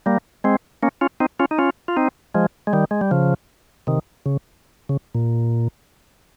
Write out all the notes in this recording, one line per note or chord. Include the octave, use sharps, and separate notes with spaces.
G3 A#3
G#3 C4
A#3 C#4
C#4 F4
C4 D#4
C#4 F4
D#4
C#4 F4
F4
C4 D#4
F3 G#3
G#3
D#3 G3
G#3
G3
C#3 F3
C3 D#3
C#3
C#3
A#2